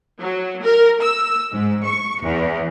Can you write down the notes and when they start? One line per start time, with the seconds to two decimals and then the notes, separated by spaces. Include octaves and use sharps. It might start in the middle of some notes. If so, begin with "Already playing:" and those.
0.20 F#3
0.63 A#4
1.01 E6
1.52 G#2
1.85 C#6
2.22 E2